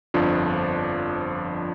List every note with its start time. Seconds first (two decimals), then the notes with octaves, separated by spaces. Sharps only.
0.14 G1 F2 F3 D4